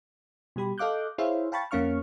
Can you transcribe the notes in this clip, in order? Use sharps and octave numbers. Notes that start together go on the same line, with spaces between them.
B2 G3 G4 B5
A4 D#5 F5 D6 F#6 G6
E4 G#4 C5 C#5 E5 F5
F5 G5 A5 B5 C#6 A6
F2 A#3 C#4 F5 C#6 F6